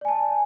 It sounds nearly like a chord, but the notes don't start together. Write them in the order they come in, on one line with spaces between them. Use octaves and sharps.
D5 G#5 A5